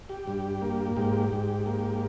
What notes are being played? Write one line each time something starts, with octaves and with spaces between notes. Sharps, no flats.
G4
G2
A#3
G#2 G4
G#2
A#3